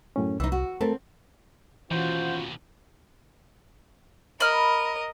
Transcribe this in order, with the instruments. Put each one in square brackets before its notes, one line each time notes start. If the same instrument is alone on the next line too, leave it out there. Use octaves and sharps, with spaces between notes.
[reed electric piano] F#2 A2 C#4
[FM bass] C2 [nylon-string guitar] E3 D#4 [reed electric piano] E6
[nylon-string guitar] F#4
[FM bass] A3 [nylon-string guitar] C4 [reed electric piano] A4 A#4 A5
[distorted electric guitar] D#2 B2 [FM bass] E3 [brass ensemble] C#4 F4 F#4 [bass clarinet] C5
[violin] A#4 D#5 [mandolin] B5 F6